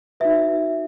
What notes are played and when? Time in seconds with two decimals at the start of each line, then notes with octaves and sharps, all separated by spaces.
0.20 D#4 F#4 B4 E5